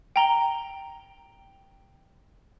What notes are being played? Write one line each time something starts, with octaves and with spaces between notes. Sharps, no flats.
G5 A#5 G7